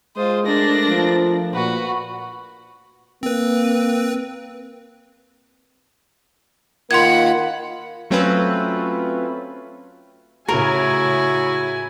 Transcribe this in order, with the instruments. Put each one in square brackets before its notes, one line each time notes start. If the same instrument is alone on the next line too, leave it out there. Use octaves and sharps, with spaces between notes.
[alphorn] G#3 [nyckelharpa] F4 D#6 [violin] C5
[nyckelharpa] A3 A#4 [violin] D4 A#6
[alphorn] F3
[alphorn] A#2 [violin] F#4 [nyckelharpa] B4
[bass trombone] A#3 [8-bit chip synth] C4 B4
[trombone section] D#3 A#3 F4 [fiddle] F#5 B5 [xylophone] C6 G#6
[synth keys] F#3 A3 C4 C#4 F4 B4
[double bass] A2 C#3 [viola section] E4 G#5 [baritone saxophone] F#4 [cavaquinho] A#4